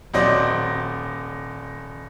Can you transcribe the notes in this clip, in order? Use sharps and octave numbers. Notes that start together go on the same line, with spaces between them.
D#1 F#3 C4 C5 D5 D#5